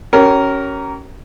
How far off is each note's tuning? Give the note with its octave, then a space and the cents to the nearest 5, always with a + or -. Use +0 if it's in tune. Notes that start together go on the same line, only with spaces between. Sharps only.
C#4 +0 G4 -40 A#4 +0